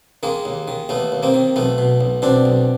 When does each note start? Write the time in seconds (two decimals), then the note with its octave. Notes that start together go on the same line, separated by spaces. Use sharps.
0.23 D#3 G#3 A#3
0.45 D#2
0.68 D#3
0.89 D#2 A3 B3
1.12 D#2
1.23 A#3 C4
1.34 D#3
1.56 B1 A3 B3
1.78 B2
2.01 B1
2.22 B2 C4 D4
2.45 B1